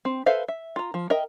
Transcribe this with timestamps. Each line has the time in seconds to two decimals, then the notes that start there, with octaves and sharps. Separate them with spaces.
0.05 C4
0.26 A4 B4 C5 E5 F5
0.48 E5
0.76 F4 A#5
0.94 F3
1.10 A#4 D#5 E5 G5